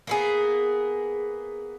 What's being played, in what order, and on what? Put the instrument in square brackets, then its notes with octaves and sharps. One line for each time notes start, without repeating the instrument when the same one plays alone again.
[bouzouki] A#3 B3 G#4